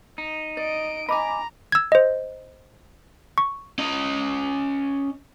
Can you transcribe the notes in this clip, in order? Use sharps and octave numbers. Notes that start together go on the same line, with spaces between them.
D#4
D5 D#5 D7
D#5 G#5 A#5 B5 D6
E6 G#6
C5 D#5
C#6
C#4 D#5